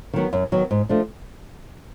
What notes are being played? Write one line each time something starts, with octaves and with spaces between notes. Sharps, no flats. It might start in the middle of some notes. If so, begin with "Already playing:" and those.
D#3 F#3 B3
F#2
D#3 F#3 B3
G#2
F3 A3 D4